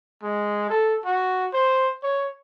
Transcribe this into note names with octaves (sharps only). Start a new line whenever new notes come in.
G#3
A4
F#4
C5
C#5